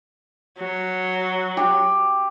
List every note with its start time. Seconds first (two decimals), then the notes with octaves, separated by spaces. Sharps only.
0.59 F#3
1.57 G4